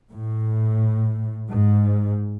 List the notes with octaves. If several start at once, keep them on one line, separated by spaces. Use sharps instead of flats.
A2
G#2